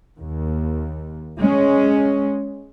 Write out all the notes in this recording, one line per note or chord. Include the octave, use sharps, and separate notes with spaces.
D#2
G#3 C#4